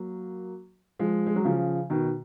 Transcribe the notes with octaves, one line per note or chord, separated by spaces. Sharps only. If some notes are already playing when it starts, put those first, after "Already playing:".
Already playing: F#3 A#3
F3 G#3
G#3
F#3
C#3 F3
B2 D#3